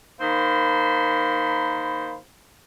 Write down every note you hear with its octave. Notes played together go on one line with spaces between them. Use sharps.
D#3 A#3 C5 B5